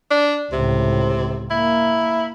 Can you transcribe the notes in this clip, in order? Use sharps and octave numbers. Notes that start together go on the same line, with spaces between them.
D4
C#2 A2 C3
A#3 E4